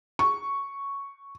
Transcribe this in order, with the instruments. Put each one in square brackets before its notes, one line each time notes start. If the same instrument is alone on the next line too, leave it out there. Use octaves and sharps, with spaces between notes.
[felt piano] C#6